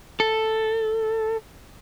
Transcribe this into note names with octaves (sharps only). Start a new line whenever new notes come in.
A4